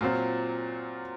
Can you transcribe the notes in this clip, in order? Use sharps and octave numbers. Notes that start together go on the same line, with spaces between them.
A#2 F#3 C4 F4